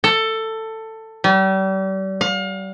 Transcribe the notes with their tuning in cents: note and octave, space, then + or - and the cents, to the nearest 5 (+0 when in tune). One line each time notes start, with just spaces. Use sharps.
A4 +15
G3 -35
F5 +35